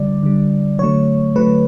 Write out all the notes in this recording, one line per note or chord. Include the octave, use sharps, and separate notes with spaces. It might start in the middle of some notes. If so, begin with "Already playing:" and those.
Already playing: D3 G3 D5
D3 G3
D3 F#3 A3 C#5
D3 F#3 A3 B4